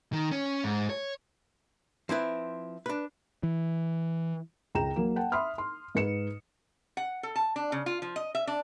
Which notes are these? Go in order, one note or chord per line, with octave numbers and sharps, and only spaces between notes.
D#3
C#4
G#2
C#5
F3 C4 E4 B4
D4 B4
E3
C#2 G5 A#5 E7
F#3 A#3
F#5 G5 A5
E5 B5 C6 D#6 F6
C6
G#2 B4 C#7 E7
F#5
A4
A5
D4
C#3
F4
F3
D#5
E5
D4